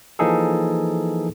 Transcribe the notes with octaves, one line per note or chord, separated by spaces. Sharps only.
E3 F3 A#3 D#4 G#4 A4